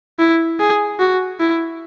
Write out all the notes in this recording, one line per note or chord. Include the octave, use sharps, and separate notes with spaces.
E4
G#4
F#4
E4